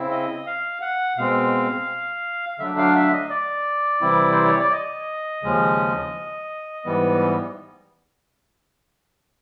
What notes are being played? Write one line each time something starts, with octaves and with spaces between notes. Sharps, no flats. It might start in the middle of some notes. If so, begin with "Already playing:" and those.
Already playing: C#3 C4 E4
D#5
F5
F#5
B2 G#3 C4 F5
D3 F#3 A3 D4 E5
F5
E5
D#5
D5
C3 E3 G3 C4 E4
C5
C#5
D5
D#5
D#2 C#3 F3 G#3 C#4
G#2 E3 G3 B3